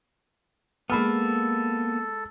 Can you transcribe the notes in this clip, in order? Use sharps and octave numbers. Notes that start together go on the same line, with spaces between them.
G#3 A#3 B3 A4 B5 F6